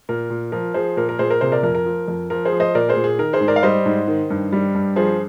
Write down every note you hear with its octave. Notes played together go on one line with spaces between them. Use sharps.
A#2 A#4
A#2
F3 A#4
F3 G#4 C5
A#2 A#4
A#4
A#2 G#4 C5
A#4
C3 G#4 C5
A#4 D5
F2 A#4
A#4
F3
F2
F3 A#4
G#4 C5
F3
C5 D#5
A#2 A#4 D5
G#4 C5
A#2
G#4
D#3 A#4
G#4 C5
G#2
A#4 D5
F5
G3 C5 D#5
G#2
D#3
G2
G3
G2
F3 G#4 C5